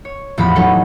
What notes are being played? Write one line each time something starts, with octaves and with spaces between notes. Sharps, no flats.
C#5
A1 E2 F3 B3 B5
F#3 D#4 A4 C#5